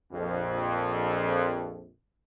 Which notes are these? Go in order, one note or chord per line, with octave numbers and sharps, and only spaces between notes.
A#1 F2